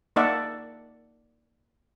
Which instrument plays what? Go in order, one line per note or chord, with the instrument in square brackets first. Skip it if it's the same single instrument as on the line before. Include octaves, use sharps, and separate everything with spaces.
[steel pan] A#3 D#4 D5 E5 F#5 A5